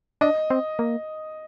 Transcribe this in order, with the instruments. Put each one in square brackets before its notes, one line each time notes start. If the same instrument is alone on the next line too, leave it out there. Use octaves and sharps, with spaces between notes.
[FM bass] D4 [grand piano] D#5
[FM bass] C4
A#3